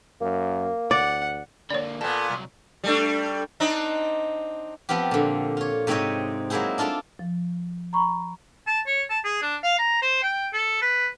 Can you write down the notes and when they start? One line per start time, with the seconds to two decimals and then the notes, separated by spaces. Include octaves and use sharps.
0.21 F#2 A#3
0.91 D2 D5 F#5
1.70 D3 A#3 C#5 D5
2.01 A#2 B3 A4
2.30 C2 F#3
2.84 G3 A3 D4
3.60 C4 D4 D#4
4.89 F3 B3 C4 F4 G4
5.11 A#2 D3
5.57 F4 C#5
5.87 G#2 C3 C4 D#4 C#5 D#5
6.50 F#3 G#3 A#3 E4 G#4 C5
6.78 D4 F4 A4 D5 A5
7.19 F3
7.93 A#5 B5 C#6
8.67 A5
8.87 C#5
9.10 A5
9.25 G#4
9.42 D4
9.63 F5
9.78 A#5
10.02 C5
10.23 G5
10.53 A4
10.82 B4